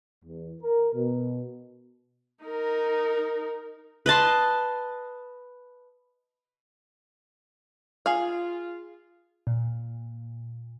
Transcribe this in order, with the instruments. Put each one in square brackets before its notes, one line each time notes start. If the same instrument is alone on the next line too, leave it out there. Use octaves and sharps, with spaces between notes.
[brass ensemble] E2
A#4
B2
[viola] D#4 A#4
[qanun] B4 D#5 A5 C6
[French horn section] F4 [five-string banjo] G#4 F5
[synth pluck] A#2